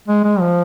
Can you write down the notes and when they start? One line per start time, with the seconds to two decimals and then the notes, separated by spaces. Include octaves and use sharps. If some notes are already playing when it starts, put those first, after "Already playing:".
0.08 G#3
0.24 G#3
0.40 F3